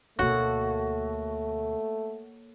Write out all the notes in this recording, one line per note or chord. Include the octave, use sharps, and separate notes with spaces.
D2 B2 A3 A#3 F#4 A4 C#5